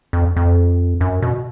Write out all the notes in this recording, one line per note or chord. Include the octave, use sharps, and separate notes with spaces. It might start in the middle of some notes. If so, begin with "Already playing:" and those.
F2
F2
F#2
B2